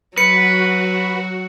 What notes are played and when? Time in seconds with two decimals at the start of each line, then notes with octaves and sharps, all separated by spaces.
0.18 F#3 F#4 B4 C#7